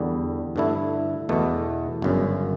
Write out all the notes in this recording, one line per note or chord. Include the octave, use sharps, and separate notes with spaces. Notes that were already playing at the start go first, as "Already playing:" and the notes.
Already playing: E2 D3 G3
G2 D3 A3 E4
E2 B2 A3
G1 F#2 C#3